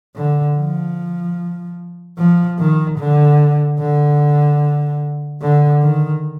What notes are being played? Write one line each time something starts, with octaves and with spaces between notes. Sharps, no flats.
D3
F3
F3
D#3
D3
D3
D3
D#3